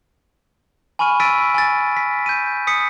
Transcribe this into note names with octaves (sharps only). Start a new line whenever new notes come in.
G#5 B5 C#6 F6 D#7
E6 A6 B6 D7 D#7
G#5 A6
B6
G6 D#7
D#6 B6 C#7